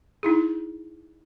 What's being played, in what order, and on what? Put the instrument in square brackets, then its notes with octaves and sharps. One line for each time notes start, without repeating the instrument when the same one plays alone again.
[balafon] D#4 E4 G#4